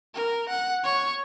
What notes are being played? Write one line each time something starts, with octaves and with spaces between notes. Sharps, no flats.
A#4
F#5
C#5 C#6